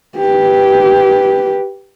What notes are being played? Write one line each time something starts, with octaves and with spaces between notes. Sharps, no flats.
G4 B4